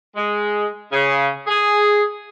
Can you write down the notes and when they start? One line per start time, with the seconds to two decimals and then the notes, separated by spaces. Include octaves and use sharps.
0.16 G#3
0.92 C#3
1.47 G#4